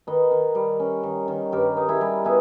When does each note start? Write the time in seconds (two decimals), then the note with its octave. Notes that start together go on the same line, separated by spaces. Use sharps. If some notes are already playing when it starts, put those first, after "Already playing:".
0.07 D#3 B4 D#5
0.31 D#3
0.55 G3
0.80 C#4
1.03 D#3
1.28 D#3
1.52 G2 G4 A#4
1.77 D#4
1.89 E4 G#4
2.01 G3
2.25 B3 E4 G#4